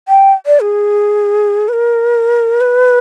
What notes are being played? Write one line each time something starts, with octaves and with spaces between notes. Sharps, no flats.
G5
D5
G#4
B4
A#4
B4